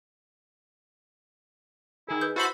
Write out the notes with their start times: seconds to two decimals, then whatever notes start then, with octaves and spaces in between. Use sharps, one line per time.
2.09 D#3 E4 G#4
2.21 B4 D#6 G6
2.36 E4 F#4 A4 C5 E5 B5